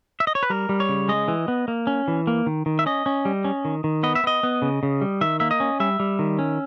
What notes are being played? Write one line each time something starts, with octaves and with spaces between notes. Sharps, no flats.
E5
D#5
C#5
B4
G3 A#4
G3
C#5
C#3
G#3 D#5
E3
B3
A#3
C#4
E3
A#3
D#3
D#3
E5
C#4 D#5
C#4
G3
C#4
D#3
D#3
B3 D#5
E5
B3 D#5
B3
C#3
C#3
G3
D#3 E5
A#3 E5
D#5
C#4
G3 E5
G3
D#3
C#4